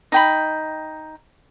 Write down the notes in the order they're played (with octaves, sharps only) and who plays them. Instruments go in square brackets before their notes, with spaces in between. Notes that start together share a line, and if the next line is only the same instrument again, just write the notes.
[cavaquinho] D#4 G5 B5